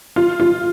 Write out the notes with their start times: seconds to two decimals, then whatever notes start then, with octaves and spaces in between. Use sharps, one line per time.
0.16 F4
0.40 F4